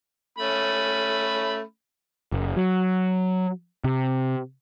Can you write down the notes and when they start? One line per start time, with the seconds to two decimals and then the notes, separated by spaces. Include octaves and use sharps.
0.39 A3 C#4 B5
2.32 F#1
2.56 F#3
3.84 C3